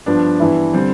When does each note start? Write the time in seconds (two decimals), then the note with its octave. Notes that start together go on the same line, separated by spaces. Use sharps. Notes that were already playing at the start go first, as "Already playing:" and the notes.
0.06 G2 F3 B3 D4
0.40 G2 E3 B3 E4
0.73 D3 G3 C4